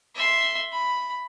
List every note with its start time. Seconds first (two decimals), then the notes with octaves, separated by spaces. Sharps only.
0.15 E5 C6
0.72 B5